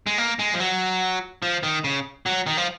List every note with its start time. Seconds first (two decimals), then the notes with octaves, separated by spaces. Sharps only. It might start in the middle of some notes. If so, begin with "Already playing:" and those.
0.07 G#3
0.18 A#3
0.39 G#3
0.54 F3
0.60 F#3
1.43 F3
1.63 D#3
1.84 C#3
2.26 F#3
2.47 D#3
2.57 F3